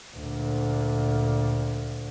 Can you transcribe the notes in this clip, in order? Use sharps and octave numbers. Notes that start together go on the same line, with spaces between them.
D2 A#2